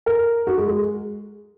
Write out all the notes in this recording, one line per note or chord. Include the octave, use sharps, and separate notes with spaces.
A#4
F#4
G#3
G#3